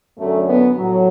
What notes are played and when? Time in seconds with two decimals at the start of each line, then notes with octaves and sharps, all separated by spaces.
0.18 F#2 D3 F#3 A3
0.47 B3
0.77 A2 F#3